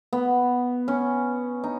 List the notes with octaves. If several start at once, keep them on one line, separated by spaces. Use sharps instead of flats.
B3
C#4
D#4